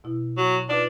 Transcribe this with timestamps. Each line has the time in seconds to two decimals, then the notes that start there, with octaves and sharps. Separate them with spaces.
0.04 B2 E4
0.37 F#3
0.69 D4 D#4 F4 B4